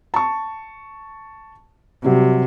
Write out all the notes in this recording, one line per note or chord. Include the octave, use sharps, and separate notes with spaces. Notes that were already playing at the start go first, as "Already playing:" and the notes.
A5 C#6
C3 F#3 G3